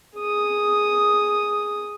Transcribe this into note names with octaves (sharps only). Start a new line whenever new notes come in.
G#4 D#6